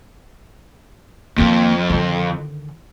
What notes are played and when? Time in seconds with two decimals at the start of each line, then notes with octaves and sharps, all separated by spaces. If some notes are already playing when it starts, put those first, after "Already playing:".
1.38 F2 D#3 A#3
1.90 D3 D#3